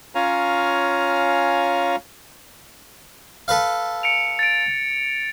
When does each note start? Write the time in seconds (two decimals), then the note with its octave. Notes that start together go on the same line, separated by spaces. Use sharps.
0.15 C#4 F4 C#5 F5 G#5 A#5
3.48 A4 B4 F5
4.03 C#7 D7 F7
4.39 A6 D7